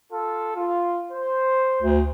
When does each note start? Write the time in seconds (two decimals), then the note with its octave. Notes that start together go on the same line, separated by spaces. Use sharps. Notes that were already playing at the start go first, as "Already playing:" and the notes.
0.11 F4 A4
0.55 F4
1.11 C5
1.82 D2